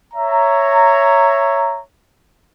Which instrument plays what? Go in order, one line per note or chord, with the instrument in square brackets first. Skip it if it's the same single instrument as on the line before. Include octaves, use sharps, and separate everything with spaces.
[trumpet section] C#5 E5 A#5